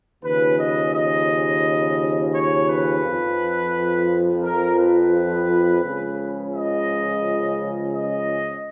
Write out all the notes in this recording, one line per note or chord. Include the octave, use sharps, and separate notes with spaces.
D#2 C#3 F3 B4
D#5
D#5
C#5
B4
F2 F3
A#4
B4
C#2 C#3 F3
D#5
D#5